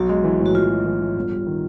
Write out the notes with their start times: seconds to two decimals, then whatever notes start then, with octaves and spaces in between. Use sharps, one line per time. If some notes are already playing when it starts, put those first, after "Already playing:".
Already playing: B1 F#4
0.09 G#3
0.24 E3
0.40 A2
0.46 F#4
0.55 B1 F4
0.70 G#3
0.86 E3
1.00 A2
1.16 G1
1.32 G3
1.47 D#3